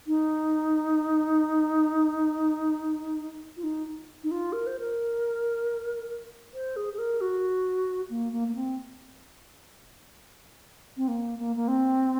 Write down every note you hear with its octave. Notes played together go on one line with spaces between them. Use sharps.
D#4
F4
D#4
D#4
F4
A#4
C5
A#4
C5
G#4
G#4
A#4
F#4
A#3
A#3
A#3
C4
C4
A#3
A#3
A#3
C4